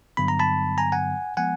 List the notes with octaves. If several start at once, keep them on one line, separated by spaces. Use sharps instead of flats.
G2 D3 F#3 B3 B5
A#5
A5 B5
G#5 A#5
F#5 G#5
F3 G#3 B3 F#5 G#5